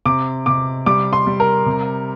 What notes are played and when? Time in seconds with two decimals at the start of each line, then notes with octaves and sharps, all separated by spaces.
0.06 C3 D6
0.46 C3 D6
0.86 G3 D6
1.13 C6
1.27 G3
1.40 A#4
1.66 C3